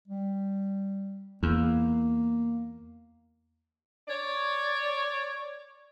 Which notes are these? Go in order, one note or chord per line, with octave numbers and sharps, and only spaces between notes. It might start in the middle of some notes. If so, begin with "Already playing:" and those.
G3
E2 A#3
C#5 D5